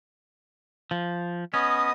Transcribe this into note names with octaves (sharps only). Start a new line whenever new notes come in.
F3
B3 C#4 D#5 D#6